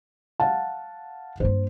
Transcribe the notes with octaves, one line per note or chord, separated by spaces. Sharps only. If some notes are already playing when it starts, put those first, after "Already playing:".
F5 F#5 A5
G2 A#3 C5